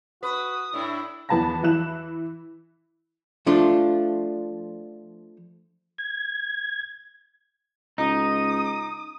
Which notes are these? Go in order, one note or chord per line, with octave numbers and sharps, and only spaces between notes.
F#4 B4 D#6
A2 D4 E4
E2 E3 B3 A5 B5 A#6
E3 E4 F#6 E7
F3 A3 D4 F4
G#6
C#2 D#4 D#6